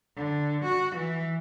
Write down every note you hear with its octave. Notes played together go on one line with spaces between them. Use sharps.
D3
F#4
E3